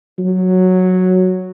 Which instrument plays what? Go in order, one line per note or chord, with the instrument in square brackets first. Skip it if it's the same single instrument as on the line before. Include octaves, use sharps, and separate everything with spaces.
[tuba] F#3